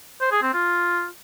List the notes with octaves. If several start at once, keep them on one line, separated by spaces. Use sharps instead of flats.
C5
G#4
C4
F4